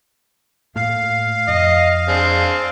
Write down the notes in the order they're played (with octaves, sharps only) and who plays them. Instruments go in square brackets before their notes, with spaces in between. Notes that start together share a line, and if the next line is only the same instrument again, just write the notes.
[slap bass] A2 A3 A#3 [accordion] F5
[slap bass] F2 [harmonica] D#5
[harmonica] C4 D4 G#4